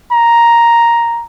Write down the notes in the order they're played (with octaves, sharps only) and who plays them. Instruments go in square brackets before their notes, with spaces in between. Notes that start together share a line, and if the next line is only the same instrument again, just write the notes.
[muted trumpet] A#5